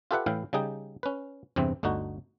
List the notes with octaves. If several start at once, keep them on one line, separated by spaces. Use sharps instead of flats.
F4 G4 A4 B4 E5 F#5
A2 E3 E4 F5 G5
C#3 G3 D#4 G#4 G5
C#4 B4
E2 G2 C3 E3 C4
G1 D2 D3 D#4 F#4